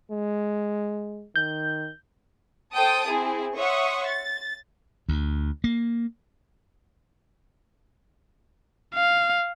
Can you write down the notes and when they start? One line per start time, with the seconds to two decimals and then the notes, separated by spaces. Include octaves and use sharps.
0.12 G#3
1.36 D#3 G6
2.74 A4 C5 G5 A5 D#6 D7
3.08 C4 E4 G#4
3.56 C#5 E5 F#5 C6 C#6 D#6
4.06 A6
5.09 D2
5.64 A#3
8.95 F5